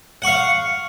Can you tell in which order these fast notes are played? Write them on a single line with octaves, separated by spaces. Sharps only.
F#5 C#6 F5